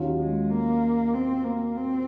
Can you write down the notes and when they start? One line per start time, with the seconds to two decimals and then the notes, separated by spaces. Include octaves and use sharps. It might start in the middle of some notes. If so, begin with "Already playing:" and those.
Already playing: D#2 D#3 F#3 C#4 F4
0.19 G#3
0.50 A#3
1.14 C4
1.44 A#3
1.76 C4